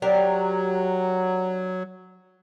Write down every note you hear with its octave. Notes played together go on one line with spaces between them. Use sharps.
F#3 D4 G4 A#4